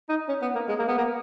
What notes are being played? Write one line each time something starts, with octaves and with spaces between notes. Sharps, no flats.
D#4
C#4
B3
A#3
G#3
A#3
B3
A#3